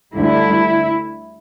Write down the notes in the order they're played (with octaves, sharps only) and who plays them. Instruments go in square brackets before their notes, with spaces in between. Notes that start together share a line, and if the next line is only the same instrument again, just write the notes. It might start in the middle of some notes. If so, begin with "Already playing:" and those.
[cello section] D2 D3 G3 E4